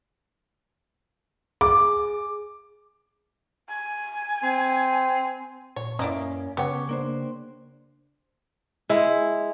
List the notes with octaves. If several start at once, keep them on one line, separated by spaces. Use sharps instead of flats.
G#4 D6
G#5
C4
A#2 C#5
F#2 A#3 C#4 E4 D5 D#5
C#3 B3 G4 C#5
A#3 D4 C5
G#3 E4